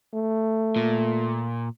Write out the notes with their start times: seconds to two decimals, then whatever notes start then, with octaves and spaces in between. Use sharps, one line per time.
0.14 A3
0.76 A#2